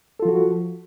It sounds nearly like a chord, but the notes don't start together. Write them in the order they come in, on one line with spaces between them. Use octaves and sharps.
A4 F4 F3 F#4